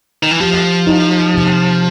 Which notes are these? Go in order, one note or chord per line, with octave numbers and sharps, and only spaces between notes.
D#3
E3
F3 G4
D#4
C3